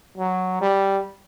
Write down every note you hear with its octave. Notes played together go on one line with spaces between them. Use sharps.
F#3
G3